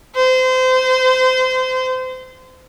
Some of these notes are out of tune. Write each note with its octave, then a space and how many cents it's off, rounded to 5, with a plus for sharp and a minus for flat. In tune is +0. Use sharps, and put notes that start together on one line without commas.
C5 -25